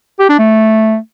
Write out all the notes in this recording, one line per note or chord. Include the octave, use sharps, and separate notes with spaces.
G4
D4
A3